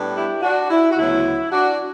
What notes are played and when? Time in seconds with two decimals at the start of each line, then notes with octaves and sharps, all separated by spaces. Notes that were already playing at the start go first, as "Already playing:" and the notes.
Already playing: A2 G3 B3 D4
0.15 E4 G4
0.42 D4 F#4
0.70 E4
0.90 F#4
0.97 D2 C#3 F#3 B3 E4
1.51 D4 F#4